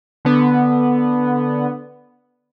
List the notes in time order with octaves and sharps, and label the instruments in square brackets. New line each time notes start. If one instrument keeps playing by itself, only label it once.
[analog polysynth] D3 B3